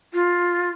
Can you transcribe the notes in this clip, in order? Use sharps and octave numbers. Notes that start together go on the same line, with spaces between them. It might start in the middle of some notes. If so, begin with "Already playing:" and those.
F4